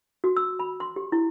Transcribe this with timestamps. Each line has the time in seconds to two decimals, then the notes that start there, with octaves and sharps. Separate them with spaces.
0.24 F#4
0.37 E6
0.59 B5
0.80 C6
0.96 G4
1.12 E4